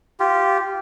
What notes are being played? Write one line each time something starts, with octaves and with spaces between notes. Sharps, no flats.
F4 G4